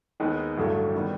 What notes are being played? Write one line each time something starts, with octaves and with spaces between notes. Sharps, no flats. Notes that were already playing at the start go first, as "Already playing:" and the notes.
D#2 D#3 G#3 B3 D#4
A1 G2 D3 F#3 A3
D#3 G3 B3